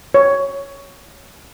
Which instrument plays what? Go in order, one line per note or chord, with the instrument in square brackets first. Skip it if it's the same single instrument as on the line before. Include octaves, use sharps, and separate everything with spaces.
[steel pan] C#5